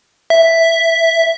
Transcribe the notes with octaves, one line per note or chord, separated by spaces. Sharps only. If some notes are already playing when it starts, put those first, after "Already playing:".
E5